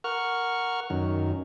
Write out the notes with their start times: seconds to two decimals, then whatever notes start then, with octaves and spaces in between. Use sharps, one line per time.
0.04 A#4 F#5 C#6 F6
0.90 F#2 D#3